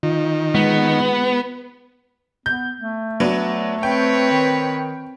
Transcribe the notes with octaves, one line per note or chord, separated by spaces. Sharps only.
D#3 F4
G#3 B3
B3 G6
A3
F#3 B3 D4
C4 B4 C#5 G5
D#3